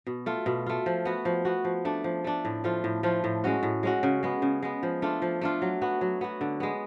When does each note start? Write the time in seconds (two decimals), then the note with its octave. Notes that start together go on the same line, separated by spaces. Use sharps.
0.07 B2
0.26 A3 F4
0.46 B2
0.66 A3 F4
0.86 F3
1.05 B3 F#4
1.25 F3
1.45 B3 F#4
1.64 F3
1.85 A3 D4
2.04 F3
2.24 A3 D4
2.45 A2
2.64 F3 A3 F4
2.84 A2
3.03 F3 A3 F4
3.24 A2
3.44 G#3 C#4 F#4
3.63 A2
3.83 G#3 C#4 F#4
4.03 C#3
4.23 G#3 B3
4.42 C#3
4.63 G#3 B3
4.83 F3
5.02 A3 D4 F4
5.22 F3
5.41 A3 D4 F4
5.62 F#3
5.81 B3 F#4
6.01 F#3
6.21 B3 F#4
6.41 D3
6.60 G#3 B3